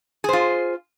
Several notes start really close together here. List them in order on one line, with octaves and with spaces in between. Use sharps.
G#4 C5 F4